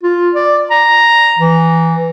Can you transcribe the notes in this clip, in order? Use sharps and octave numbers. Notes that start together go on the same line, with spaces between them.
F4
D5
A#5
E3